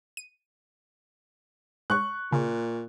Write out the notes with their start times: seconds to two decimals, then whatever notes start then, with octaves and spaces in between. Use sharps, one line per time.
0.17 D#7
1.90 G#2 C#6 F#6
2.32 A#2 C#3